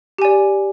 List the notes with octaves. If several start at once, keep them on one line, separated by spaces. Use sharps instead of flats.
G4 D5 G#5